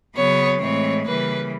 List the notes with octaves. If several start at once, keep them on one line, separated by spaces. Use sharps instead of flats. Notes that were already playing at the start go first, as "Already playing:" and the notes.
C#3 F#3 B3 C#5
A2 E3 G#3 C4 C#5
C#3 E3 G3 A#3 B4